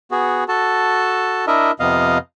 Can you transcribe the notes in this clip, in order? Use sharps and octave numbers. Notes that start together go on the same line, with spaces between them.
B3 F#4 G#4
F#4 A4 A5
D4 E4 A#4 D#5 E5
F2 C3 B3 D#5 F5